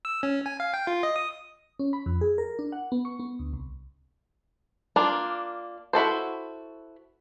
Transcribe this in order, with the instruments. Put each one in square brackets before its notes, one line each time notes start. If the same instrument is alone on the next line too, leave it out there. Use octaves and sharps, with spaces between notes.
[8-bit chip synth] E6
C#4
G#5
F5
G5
F4
D#5
D#6
[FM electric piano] C#4
B5
F2
G#4
A#4
D4
F#5
B3
C#6
B3
D2
C2
[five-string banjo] A#3 D4 F4
E4 F#4 A4 C5